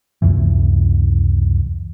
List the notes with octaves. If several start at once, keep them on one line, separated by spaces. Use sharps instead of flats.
C#2 F#2 C3 E3